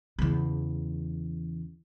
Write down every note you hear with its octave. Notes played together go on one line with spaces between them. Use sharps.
E2 C#3